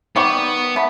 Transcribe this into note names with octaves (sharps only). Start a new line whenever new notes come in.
D#3 G3 B3 C#6
A3 B5